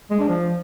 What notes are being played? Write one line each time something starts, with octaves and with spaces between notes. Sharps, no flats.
G#3
D4
F3